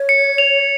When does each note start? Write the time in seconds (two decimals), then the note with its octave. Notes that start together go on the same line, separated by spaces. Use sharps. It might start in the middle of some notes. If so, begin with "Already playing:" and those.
Already playing: C#5
0.09 C#7
0.38 F7